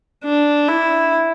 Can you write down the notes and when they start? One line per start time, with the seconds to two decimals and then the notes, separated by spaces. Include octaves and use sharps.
0.24 D4
0.68 E4